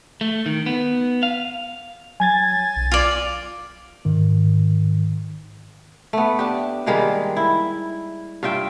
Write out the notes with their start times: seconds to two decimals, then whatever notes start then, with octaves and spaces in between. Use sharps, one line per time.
0.21 A3
0.46 D#3
0.66 B3
1.23 F5
2.20 F#3 G#5 G#6 A6
2.76 B1
2.92 F4 D5
4.05 G#2 D#3
6.13 A3 B3
6.39 D4 G4
6.86 D#3 G3 G#3 A#3
7.36 E4
8.43 G2 F4 E5 G5